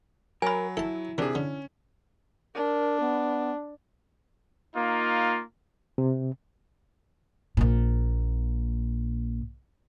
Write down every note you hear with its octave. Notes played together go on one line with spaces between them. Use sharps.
F#3 A#4 G#5 B5
E4 A4 A5
C3 D#3 D4 G#4
D3 C#4
D4 A#4
B3
A#3 D#4 F4
C3
A#1 A#2